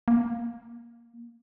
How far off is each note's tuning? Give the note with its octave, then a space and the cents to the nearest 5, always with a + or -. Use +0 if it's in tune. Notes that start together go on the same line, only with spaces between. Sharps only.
A#3 +10